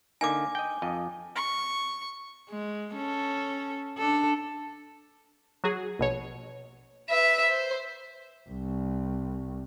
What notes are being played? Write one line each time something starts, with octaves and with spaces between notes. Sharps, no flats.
D3 A#3 D#4 G#5 D6
D#5 G5
F2 D#5
C#6
G#3
C#4 A4
D4 A4
F#3 F#4 G#4
A#1 B2 C#5
B4 E5
C5
C2